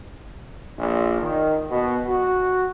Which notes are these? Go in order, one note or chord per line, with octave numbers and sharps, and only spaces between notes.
A#1
D#3
B2
F#4